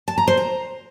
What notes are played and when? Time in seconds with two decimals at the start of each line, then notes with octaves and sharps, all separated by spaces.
0.08 A5
0.18 A#5
0.28 C5
0.37 A#5